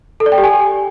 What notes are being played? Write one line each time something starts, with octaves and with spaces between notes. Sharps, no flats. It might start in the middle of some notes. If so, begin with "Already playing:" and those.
A4
D5
G5
G4
G#5